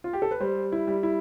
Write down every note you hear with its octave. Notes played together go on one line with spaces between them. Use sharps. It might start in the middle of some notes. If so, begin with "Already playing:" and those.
F4
G4
A4
B4
G3 C5
E4
G3
E4